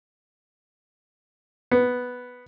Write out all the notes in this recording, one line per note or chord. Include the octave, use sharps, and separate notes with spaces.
B3